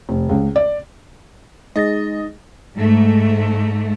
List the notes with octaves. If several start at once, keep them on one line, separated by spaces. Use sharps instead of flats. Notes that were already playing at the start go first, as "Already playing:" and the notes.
F1
C#2
D5
G#3 D#4 D#5 A6 A#6
G#2 A3